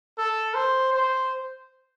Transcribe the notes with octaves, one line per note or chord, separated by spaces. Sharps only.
A4
C5
C5